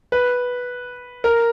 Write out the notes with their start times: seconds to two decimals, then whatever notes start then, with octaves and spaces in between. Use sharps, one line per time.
0.12 B4
1.24 A#4